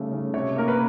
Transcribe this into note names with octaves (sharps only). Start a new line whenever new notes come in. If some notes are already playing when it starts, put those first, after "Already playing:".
Already playing: C#3 G3 A3
C#3
C3 C#5
A#3 A#4
B4